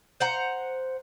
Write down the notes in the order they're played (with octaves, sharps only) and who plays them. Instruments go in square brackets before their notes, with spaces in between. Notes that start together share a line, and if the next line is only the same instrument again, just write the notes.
[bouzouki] C5 F#5 A#5